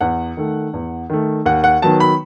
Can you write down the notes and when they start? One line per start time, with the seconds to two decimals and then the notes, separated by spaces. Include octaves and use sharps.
0.01 E2 F#5
0.37 D#3 A3
0.73 E2
1.10 D#3 A3
1.46 D#2 F#5
1.64 F#5
1.82 D#3 F#3 B3 A5
2.00 B5